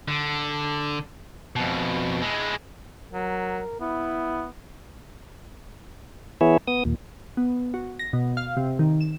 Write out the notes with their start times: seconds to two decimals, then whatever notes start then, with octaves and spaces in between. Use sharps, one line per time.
0.08 D3
1.56 F2 B2
2.21 G#3 E4
3.13 F#3 A#4
3.80 B3 E4
6.41 E3 B3 E4 G#4 C#5 E5
6.68 B3 D#6
6.85 D#2 A#2
7.37 B3
7.74 F#4
7.99 A#6
8.13 B2
8.37 F5
8.57 C3
8.79 D#3
9.01 E7